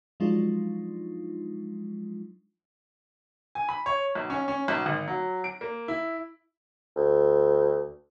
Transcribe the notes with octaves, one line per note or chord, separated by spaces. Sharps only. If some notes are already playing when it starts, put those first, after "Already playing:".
F3 F#3 G#3 D4 D#4 F4
G#5
B5
C#5
B1
C#4
C#4
B1
G#1
F#3
D7
A#3
E4
D2